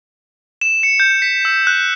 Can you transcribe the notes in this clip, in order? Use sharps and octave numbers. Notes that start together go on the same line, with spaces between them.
E7
C#7
G6
B6
E6
F#6